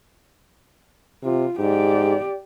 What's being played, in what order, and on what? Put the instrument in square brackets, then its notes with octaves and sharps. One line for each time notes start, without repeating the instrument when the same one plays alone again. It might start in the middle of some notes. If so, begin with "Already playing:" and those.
[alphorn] C3 [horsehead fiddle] F4
[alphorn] G#2 [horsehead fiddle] G4 D5